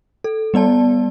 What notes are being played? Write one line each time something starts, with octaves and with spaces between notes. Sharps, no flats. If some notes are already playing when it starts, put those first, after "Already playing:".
A4
G3 B3 D5 A5